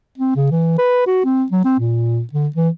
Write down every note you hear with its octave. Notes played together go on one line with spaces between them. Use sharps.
C4
C#3
E3
B4
F#4
C4
F#3
C4
A#2
D3
E3